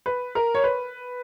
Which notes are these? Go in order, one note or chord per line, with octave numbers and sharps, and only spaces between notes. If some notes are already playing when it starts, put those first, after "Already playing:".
B4
A#4
C#5
B4